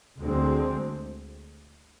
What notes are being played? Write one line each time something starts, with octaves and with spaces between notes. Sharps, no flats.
D2 D3 G#3 C4